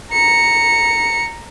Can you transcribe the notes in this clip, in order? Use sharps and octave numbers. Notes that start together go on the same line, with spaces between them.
A#5 C#7